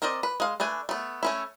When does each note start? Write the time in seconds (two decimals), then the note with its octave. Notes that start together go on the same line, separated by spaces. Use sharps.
0.02 C4 A#4 C5 D5 D#5
0.23 B4
0.40 G#3 F5
0.60 A3 D4 B4 G#5
0.89 A3 B3
1.23 A3 C#4 E4